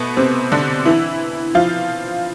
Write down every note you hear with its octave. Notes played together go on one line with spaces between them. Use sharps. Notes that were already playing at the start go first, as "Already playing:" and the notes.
Already playing: B2 A3 B3
C3 C4
D3 D4
E3 E4
F3 F4